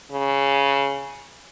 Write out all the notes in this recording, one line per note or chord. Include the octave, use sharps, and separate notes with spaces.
C#3